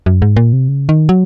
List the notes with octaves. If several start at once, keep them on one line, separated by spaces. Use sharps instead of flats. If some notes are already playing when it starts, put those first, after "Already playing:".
F#2
G#2
A#2
C3
C#3
D#3
F#3